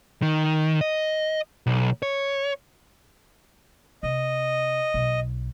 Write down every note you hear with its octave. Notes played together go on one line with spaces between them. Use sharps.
D#3
D#5
B1
C#5
C3 D#5
B1